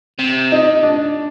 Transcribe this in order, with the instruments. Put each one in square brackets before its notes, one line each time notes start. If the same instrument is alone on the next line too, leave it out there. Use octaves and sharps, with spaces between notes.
[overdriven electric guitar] C3
[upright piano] D#4
D4